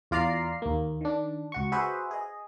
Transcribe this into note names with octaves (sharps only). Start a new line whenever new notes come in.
E2 F4 D5 A#5 F6 C7
D#2 A#3
D#3 D4
C#2 F#4 C#6
F#4 G#4 B4 C5 E5
G#4 D#5